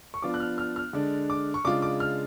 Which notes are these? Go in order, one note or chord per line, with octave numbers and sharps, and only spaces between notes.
C#6
F3 B3 D4 F4 D6
F#6
F6
F6
F6
D3 G#3 D4
D6
C#6
C#3 G#3 D4 F4 D6
D6
F6